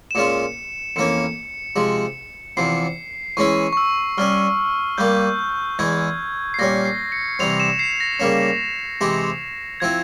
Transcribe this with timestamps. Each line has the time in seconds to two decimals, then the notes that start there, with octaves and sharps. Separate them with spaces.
0.11 E7
0.15 A#2 G#3 C#4 F4 C#7
0.96 F2 E3 A#3 C#4 C#7
1.76 C3 F3 G#3
2.57 E2 C3 F3 C7
3.37 E3 G#3 C#4 E4 C#6
3.73 C#6
3.77 E6
4.18 G2 G3 C#4 F6
4.98 G2 G3 A#3 G6
5.79 E2 E3 G#3 E4 G#6
6.54 C7
6.59 A#2 G3 C#4 A#6
6.85 C7
7.12 C#7
7.39 C3 E3 G3 C4 F7
7.60 E7
7.79 C7
8.00 A#6
8.20 C#3 G3 A#3 C#4
9.01 C3 E3 G#3 C4 G4
9.80 F3 C4 E4 G#6